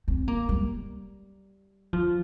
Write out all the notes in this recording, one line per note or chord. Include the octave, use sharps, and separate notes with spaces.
C4
A#3
G3
F3